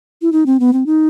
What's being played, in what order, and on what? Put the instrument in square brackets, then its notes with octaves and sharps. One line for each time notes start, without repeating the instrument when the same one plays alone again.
[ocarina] E4
D#4
C4
B3
C4
D#4